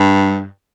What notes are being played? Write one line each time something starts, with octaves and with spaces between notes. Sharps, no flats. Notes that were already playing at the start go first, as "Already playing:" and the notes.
Already playing: G2